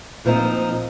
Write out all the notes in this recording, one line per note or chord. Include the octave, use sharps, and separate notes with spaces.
A#2 F3 C4 D#4